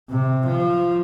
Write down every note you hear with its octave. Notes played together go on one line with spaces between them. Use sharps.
C3
F3